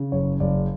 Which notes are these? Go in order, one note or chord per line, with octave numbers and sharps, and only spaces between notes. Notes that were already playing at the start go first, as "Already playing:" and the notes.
Already playing: C#3
F#1 C#5
F#1 D5